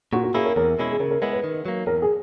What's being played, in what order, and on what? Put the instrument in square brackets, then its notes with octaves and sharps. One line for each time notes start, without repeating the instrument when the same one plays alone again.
[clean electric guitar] A#2 [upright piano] F#4
[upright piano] F#4
[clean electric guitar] A#3 C#4 E4 [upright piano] G#4
[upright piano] A#4
[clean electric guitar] E2 [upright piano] A#4
[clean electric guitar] B2 G#3 C#4 E4
[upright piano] G#4
[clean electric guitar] C#3 [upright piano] A#4
[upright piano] A#4
[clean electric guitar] G#3 B3 E4 [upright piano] B4
[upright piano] B4
[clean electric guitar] D#3
F#3 A#3
[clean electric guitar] E2 [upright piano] A#4
[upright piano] G#4